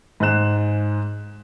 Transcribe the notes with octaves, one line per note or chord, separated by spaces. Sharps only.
G#2 G#3 C5 F#6 E7